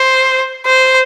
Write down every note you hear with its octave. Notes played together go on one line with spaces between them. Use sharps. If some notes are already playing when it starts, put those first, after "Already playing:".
Already playing: C5
C5